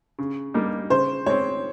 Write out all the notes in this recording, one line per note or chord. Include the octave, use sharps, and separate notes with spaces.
C#3
G3 A#3 D#4 G4
C#3 C5
G#3 C4 C#5